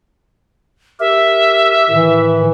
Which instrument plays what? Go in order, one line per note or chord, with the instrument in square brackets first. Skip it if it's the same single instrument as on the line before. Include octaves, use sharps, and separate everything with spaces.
[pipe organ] G4 A#4 [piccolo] E5
[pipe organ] A2 D#3 [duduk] E3